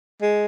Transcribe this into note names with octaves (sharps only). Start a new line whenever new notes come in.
G#3